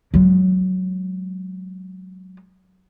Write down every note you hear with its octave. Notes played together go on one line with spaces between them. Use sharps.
F#3 G#3